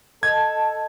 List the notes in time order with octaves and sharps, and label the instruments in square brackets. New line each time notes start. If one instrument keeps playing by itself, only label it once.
[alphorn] A4 [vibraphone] D#5 A5 [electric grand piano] G#6